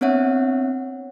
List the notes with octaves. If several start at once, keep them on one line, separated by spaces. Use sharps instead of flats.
B3 C4 D4 C#5 E5 F#5